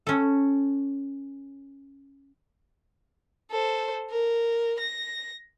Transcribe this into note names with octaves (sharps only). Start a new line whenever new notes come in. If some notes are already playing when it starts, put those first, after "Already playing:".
C#4 A4
A4 C5
A#4
A#6